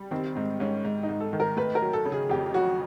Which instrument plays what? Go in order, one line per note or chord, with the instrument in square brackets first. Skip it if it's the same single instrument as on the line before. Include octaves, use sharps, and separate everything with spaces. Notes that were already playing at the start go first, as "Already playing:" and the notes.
Already playing: [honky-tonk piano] G3
[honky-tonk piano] D#3 [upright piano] C4
[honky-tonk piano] G#2 [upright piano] C4
[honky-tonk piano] G#2 [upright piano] C#4
[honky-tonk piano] G#2
[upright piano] D#4
[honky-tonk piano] G#2
[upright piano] A4
[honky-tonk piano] D#3
[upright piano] A#4
[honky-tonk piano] A3 [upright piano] B4
[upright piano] A#4
[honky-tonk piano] F#3
[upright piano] A4
[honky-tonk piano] C#3
[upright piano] G#4
[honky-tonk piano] F2 [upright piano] G4
[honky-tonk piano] F#3 [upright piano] F#4